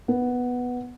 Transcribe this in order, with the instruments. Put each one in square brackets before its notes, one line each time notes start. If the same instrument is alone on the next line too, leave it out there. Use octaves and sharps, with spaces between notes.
[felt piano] B3